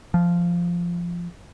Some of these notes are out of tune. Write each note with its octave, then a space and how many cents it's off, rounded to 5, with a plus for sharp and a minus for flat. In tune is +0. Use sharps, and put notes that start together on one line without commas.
F3 -10